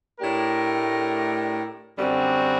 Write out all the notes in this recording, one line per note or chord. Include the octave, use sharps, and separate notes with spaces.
A2 A3 D4 G4 A#4
F#2 D3 G3 C4 F#4